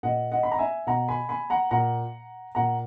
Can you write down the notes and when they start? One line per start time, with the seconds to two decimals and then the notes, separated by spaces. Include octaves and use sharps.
0.03 A#2 D#5 F#5
0.31 D#5 F#5
0.43 B5
0.52 A#5
0.59 E5 G#5
0.87 B2 F#5 A#5
1.08 G#5 B5
1.29 G#5 B5
1.50 F#5 A#5
1.71 A#2 F#5 A#5
2.55 A#2 F#5 A#5